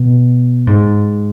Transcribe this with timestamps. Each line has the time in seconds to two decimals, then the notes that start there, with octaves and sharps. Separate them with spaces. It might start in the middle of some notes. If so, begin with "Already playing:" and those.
Already playing: B2
0.67 G#2